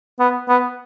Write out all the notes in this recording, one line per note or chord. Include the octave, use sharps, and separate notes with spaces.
B3
B3